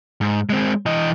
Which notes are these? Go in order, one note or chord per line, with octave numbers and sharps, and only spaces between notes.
G#2
G#3 C4
E3 D#5